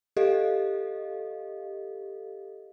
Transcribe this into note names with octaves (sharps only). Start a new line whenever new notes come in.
G4 A4 D#5 F5